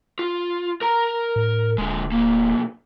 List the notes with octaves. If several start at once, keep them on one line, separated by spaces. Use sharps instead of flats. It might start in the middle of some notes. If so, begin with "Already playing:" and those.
F4
A#4 A#5
A2
D1 D3 G#3
B1 A#3